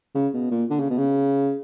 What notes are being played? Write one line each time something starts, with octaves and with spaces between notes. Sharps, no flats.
C#3
B2
A#2
D3
C#3
B2
C#3